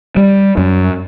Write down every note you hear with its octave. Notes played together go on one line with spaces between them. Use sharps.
G3
F#2